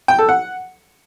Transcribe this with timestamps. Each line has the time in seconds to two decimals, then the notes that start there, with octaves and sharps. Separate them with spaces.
0.08 G5
0.18 A4
0.29 F#5